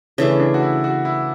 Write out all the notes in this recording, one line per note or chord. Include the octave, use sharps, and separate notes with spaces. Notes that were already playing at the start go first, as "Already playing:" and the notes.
C#3 E3 A3 D4
D4
F#4
E4
F#4
E4